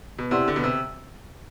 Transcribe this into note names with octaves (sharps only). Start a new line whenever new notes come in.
B2
C3 E4 G4 D5 F#5 C6
D3
B2
C3